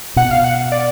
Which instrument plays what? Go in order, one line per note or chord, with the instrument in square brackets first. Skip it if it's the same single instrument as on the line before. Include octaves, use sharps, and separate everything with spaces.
[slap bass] B2 [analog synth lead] F#5
[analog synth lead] F5
F#5
D5